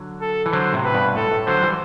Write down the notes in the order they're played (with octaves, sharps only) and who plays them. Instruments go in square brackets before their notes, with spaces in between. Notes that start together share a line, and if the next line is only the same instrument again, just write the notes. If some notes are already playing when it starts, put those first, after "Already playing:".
Already playing: [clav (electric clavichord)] D3 F#3
[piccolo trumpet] A4
[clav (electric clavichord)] E3
[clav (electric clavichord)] D3 F#3 [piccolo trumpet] C5
[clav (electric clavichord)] A2 C3
[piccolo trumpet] B4
[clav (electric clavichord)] G2 B2
[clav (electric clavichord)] A2 [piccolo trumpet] A4
[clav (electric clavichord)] A2
[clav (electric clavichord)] D3 F#3 [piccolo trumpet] C5
[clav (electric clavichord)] E3 G3